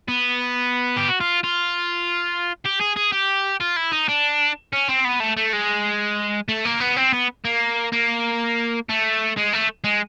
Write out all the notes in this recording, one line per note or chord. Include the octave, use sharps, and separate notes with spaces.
B3
G4
F#4
F4
F4
G4
G#4
G#4
G4
F4
E4
D#4
D4
C#4
C4
B3
A3
A3
G#3
A3
A#3
B3
C4
B3
A#3
A#3
A3
G#3
A3
G#3